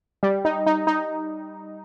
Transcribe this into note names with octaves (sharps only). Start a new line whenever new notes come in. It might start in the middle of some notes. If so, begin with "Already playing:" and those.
G3
D#4
D#4
D#4